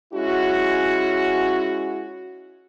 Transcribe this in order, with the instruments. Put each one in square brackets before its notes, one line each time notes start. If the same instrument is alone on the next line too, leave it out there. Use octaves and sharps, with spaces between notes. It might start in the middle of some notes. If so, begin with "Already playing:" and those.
[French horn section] G#3 C#4 E4 F#4